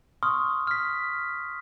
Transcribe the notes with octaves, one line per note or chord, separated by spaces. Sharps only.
C6 C#6 D#6 F6
F6 B6